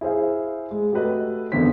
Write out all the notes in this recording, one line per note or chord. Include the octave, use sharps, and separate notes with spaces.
E4 G#4 C5 F5
G#3
A3 F#4 G4 A4 B4 D#5
G#1 E2 D3 B3 C4 B6